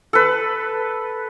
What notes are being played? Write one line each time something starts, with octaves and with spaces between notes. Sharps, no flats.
A4 B4